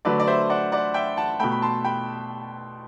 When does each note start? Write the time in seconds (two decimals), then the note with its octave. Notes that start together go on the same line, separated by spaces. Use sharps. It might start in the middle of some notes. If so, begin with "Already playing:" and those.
0.05 D3 F#3 A3 B4 D5
0.20 D5
0.27 C5 E5
0.50 D5 F#5
0.72 D5 F#5
0.94 E5 G5
1.17 F#5 A5
1.40 B2 A3 G5 B5
1.52 B5
1.62 A5 C6
1.85 G5 B5